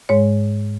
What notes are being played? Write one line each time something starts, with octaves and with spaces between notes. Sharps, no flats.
G#2 G#3 C#5